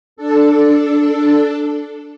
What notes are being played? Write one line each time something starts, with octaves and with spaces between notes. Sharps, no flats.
D4 A4